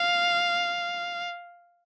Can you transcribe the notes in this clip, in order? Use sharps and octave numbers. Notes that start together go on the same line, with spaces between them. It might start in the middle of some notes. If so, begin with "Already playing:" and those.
Already playing: F5